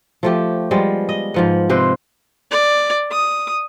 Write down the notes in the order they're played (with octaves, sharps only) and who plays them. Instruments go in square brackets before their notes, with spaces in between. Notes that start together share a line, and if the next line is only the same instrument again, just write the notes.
[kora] F3 A3 G4
F3 G3 G#3 B3
D#5
G#2 F3 B3
C3 B4 C5 D#5
[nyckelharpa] D5
D#6